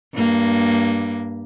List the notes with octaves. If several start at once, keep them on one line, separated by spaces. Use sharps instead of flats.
G2 A#3